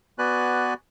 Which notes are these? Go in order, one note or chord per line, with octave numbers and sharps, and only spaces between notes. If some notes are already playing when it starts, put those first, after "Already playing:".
B3 F#4 B4 D5 G#5 F#6